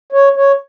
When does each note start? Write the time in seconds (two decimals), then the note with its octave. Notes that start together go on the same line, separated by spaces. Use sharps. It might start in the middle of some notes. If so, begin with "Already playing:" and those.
0.12 C#5
0.36 C#5